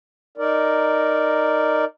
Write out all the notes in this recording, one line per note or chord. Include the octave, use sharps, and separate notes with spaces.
D#4 A#4 D5